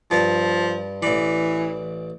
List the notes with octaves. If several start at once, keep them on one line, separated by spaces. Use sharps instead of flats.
G2 F3
A1 E3 D5